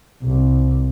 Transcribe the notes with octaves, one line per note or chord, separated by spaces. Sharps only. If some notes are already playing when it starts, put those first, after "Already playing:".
C2